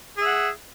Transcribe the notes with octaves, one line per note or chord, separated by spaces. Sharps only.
G#4 E5 F#5